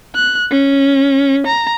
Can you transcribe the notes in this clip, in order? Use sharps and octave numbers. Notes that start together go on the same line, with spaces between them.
F#6
C#4
A#5